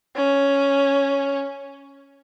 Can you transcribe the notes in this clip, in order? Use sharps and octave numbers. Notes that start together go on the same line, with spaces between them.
C#4